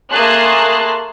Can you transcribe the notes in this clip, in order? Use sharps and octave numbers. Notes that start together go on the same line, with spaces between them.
A3 A#3 G#4 A5 C6 F#6